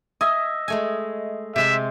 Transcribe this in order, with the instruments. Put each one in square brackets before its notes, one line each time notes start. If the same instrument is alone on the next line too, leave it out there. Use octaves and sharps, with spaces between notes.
[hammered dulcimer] D#5 E5 [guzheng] G#5
[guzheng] G#3 A3 G#5
[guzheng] C3 G#3 C6 [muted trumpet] E5